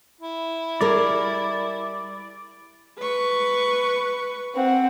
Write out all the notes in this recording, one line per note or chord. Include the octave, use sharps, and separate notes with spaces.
E4
G3 G#4 A#4 D5
B4 C#6
C4 F#5